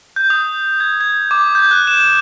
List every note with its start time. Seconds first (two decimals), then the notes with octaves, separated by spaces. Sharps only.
0.16 G6
0.30 D#6
0.80 G#6
1.00 G#6
1.31 D6
1.55 G6
1.71 F#6
1.87 E7